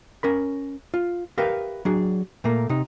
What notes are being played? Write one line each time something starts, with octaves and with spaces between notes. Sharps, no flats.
C#4 A#4 B5
F4
G4 A#4 B4 E5 F5
F#3 D4 G#4
A#2 A3 A#3
C3 D#4